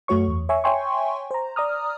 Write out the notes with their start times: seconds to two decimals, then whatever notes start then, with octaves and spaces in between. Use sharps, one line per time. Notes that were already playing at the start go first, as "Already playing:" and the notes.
0.08 F#2 A3 F#4 C#5 C#6
0.28 E2
0.49 C#5 E5 G#5 C#6
0.64 C#5 E5 G5 G#5 C6 C#6
1.31 C5 A#5
1.56 D5 A#5 D#6 F6